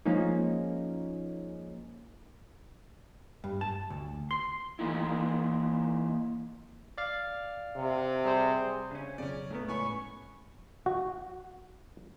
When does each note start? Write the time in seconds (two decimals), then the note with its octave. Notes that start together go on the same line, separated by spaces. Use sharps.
0.05 F3 G#3 A#3 C#4 D#4
3.44 G2
3.61 A5
3.90 D2
4.31 C6
4.79 E3 A#3 D#4 E4
6.98 D5 F5
7.77 C3
8.25 G3 G#4 C5
8.91 C#3 C#4
9.18 B1 F2 C#3 C#4 D5
9.50 A2 C#3 B3 A#4 B4
9.68 C#2 A2 C#5 G#5 B5 C#6
10.86 F#4